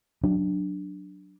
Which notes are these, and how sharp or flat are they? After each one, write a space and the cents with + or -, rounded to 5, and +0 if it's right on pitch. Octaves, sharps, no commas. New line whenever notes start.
F#3 +0 D4 +0